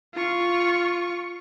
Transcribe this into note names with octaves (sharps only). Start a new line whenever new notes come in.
F4 C#6